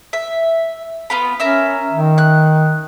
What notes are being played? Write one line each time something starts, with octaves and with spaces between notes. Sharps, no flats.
E5
B3 F4 B5
C#4 A#4 E5 E6
D#3
F#6